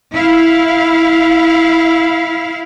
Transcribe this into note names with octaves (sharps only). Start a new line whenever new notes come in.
E4 F5